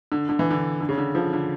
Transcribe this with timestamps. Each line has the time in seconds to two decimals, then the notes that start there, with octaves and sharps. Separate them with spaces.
0.12 D3
0.29 D3
0.39 E3
0.51 D3
0.81 D3
0.89 C#3
0.98 D3
1.15 D3 F3
1.33 D3